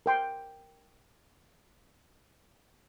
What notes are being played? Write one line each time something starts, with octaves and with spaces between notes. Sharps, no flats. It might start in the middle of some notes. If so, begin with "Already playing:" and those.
A#4 G5 C6